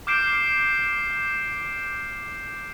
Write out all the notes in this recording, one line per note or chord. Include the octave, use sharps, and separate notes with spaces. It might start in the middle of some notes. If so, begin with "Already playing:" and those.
D6 F6 G6 C7 D7 E7